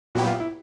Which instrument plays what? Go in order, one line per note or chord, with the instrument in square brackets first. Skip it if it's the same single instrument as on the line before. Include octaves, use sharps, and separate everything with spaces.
[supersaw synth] A#2 F#3 B3 E4 G4 [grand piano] F#4
[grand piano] F4
E4